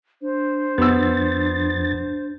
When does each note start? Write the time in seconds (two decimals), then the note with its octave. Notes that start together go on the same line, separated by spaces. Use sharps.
0.21 D4 C5
0.78 F2 B3 E6 A6